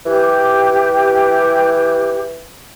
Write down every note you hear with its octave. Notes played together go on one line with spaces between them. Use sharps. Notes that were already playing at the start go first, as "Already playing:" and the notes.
E3 G4